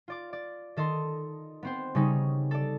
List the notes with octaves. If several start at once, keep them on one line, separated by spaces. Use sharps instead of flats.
F4 D5 D6
D5
D#3 A4 D#5 C6
B3 C4 C5
C#3 G3 C#4 D#4
A4 D5